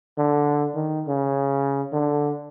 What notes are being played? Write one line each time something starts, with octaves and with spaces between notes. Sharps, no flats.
D3
D#3
C#3
D3